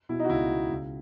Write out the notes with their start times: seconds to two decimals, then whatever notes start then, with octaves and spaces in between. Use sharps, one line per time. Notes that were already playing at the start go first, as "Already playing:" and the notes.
0.09 B2 E4
0.20 D#4
0.24 F#4
0.29 C#2 E4
0.50 B2
0.70 C#2